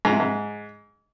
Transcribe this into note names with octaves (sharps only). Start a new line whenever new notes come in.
G#2
C3
G#2